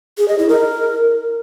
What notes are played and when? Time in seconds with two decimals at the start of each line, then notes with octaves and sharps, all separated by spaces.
0.18 G#4
0.28 D#5
0.39 E4
0.49 A#4